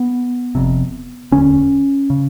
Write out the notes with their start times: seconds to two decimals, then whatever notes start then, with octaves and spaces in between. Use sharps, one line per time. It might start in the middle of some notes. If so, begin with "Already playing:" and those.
Already playing: B3
0.55 F1 F2 C3
1.31 E1 D2 D3 C#4
2.10 C#3